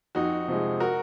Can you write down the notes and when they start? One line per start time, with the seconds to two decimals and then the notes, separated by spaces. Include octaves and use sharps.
0.15 F2 D#4 F#4
0.48 C3 F3 G#3
0.80 F#4 A#4